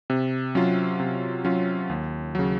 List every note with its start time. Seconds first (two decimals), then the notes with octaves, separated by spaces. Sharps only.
0.10 C3
0.55 F#3 C#4 F4
1.00 C3
1.45 F#3 C#4 F4
1.89 D#2
2.35 C#3 F#3